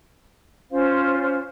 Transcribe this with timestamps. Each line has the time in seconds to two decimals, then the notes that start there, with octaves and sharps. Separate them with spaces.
0.71 C#4 F4 C5 F5